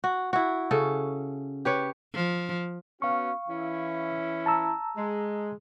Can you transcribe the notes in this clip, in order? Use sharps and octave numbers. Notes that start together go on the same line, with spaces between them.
F#4
E4 F#4
C#3 C#4 A4
G4 B4 C#5
F3
B3 C#4 F#4 F5 C#6
E3 C#4 E4
A5 A#5 E6
G#3